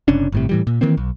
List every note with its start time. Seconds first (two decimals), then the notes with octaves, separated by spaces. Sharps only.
0.08 F#1 C3 C#4 D4
0.32 G1 A2 C3
0.49 A2 E3 G3
0.67 A#2
0.81 D#3 E3 A#3 C4
0.97 B1